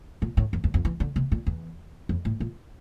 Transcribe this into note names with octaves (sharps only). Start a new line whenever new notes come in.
A#2
A2
F2
E2
F2
E3
D3
C3
A#2
E2
F2
A2
A#2